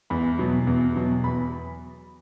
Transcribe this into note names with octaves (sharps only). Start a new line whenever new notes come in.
E2 B5
B2 F#3
E2
B2 F#3
E2 B5